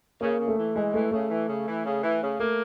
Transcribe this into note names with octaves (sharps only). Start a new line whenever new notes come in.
C#3 A#3
C#3
A3
E3
E3 G#3
E3 A3
C#3 A3
E3
C#3
E3
C#3
E3
C#3
A3 A#3